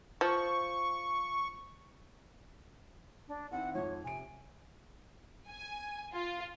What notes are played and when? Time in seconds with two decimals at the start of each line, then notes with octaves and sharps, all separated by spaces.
0.21 F3 C#6
3.28 D4
3.51 D#3 C4 E4 F#5
3.74 F2 G#2 F3 C#5
4.04 C3 G#5 D7
5.51 G#5
6.13 F4